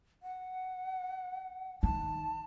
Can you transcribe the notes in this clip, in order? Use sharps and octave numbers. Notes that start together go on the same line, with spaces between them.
F#5
D#3 A5